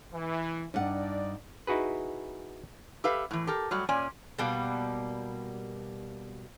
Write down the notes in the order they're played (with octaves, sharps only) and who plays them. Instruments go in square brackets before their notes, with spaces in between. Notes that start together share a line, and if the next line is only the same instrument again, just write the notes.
[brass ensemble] E3
[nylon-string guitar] G2 F#5 [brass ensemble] D4 D#4 D5
[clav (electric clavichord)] D#4 E4 F#4 G#4 B4
[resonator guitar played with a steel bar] G4 A4 B4 E5 F5
A2 E3
G4 A4 A#4
F#3 G3 A3 F#4
A#2 C#4 D5 G#5
[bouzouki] B2 G3 A#3